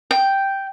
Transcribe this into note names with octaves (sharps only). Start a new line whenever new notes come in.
G5